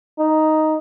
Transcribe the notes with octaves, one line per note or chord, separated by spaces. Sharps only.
D#4